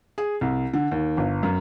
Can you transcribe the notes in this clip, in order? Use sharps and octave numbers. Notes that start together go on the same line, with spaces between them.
G#4
C2
D3
D#2
G1
F#2